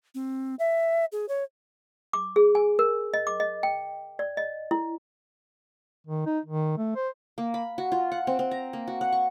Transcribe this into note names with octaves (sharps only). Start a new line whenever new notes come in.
C4
E5
G#4
C#5
D6
G#4
G#5
A#4
D#5
D6
D#5
G5
D5
D#5
E4
D#3
D#4
D#3
A3
C5
A#3
B5
F#4
F4
F#5
C4
C4
A#5
A#3
F#4
F#5
C#6